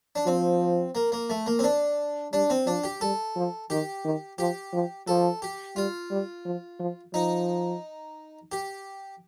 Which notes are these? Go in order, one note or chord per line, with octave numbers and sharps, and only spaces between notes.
D4
F3 C4
A#3
A#3
A3
A#3
C4
D4
G3 D4
C4
F3 D4
G4
G3 A4
F3
D#3 G4
D#3
F3 G4
F3
F3 A4
G4
G3 F4
G3
F3
F3
F3 D#4
G4